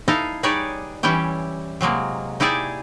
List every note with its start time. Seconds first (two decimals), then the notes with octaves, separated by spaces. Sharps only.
0.08 D#4 E4 A4 D#5 F5
0.43 G3 D#4 G#4 B4 C#5 D5
1.03 E3 G3 C#4 E4 G4
1.81 C3 F#3 G#3 A#3
2.40 D#4 E4 G4 G#4 D5 E5